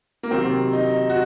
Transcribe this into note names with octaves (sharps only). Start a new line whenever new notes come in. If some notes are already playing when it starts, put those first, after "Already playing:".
A#3
C3 D#3 F#3 C4
D#4
F#4